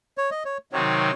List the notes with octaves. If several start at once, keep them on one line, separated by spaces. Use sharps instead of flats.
C#5
D#5
C#5
C3 D#3 F#3 C4 D#4 C#5